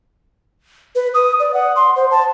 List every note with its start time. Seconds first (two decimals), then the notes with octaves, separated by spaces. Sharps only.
0.95 B4
1.14 D#6
1.40 D5
1.54 F#5
1.76 C6
1.96 C5
2.11 A5